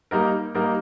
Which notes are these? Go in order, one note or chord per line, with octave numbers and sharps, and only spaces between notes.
G3 A#3 D#4 A#4
G3 A#3 D#4 A#4